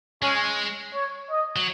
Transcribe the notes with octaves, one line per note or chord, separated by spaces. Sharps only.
G#3 C#4
C#5
D#5
F#3